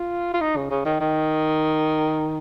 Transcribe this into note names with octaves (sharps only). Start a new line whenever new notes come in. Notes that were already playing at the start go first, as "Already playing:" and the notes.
Already playing: F4
F4
D#4
C#3
C#3
D#3
D#3